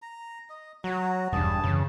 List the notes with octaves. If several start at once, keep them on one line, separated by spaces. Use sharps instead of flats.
A#5
D#5
F#3 F#4 A#5
E1 E2 G2 D4 G#4 A5
F#2 C#3 E3